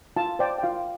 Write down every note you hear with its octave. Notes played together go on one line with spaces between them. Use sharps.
F4 F5 A5
C5 D5 G5
G5
F4 F5